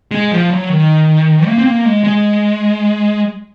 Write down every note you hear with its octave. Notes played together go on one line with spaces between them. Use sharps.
G#3
F3
F#3
D#3
A#3
C4
A#3
G#3
G#3